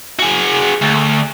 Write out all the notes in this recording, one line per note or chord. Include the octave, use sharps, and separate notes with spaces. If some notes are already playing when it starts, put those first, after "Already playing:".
F#4 G#4
D2